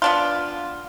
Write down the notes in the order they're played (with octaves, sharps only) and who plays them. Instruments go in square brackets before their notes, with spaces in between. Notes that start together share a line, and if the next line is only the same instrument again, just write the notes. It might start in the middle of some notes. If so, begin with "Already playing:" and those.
[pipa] B3 D4 F4